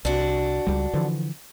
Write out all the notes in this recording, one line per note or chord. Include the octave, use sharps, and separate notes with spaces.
C2 D4 F#4
C#2 G3
D3 E3 F3